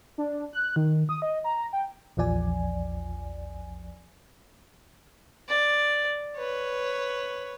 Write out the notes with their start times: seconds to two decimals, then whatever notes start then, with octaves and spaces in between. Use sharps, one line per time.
0.18 D4
0.53 F#6
0.76 D#3
1.09 D#6
1.22 D#5
1.44 A#5
1.73 G5
2.17 A#1 E2 F3 D5 G#5
5.48 D5
6.36 B4 C#5